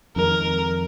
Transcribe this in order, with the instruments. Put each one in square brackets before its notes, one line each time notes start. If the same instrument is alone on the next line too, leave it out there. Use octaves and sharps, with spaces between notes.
[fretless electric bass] F2 D#3 G#3 [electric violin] A#4